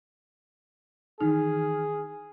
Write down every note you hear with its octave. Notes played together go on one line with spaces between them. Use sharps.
D#3 E3 D#4 G#4 F6